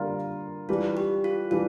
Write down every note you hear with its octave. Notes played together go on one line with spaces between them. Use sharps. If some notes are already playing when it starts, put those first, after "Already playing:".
Already playing: D3 G3 A#3 F4 A#4
E3 G3 D4 F4
G4
F4
E3 G3 D4 F4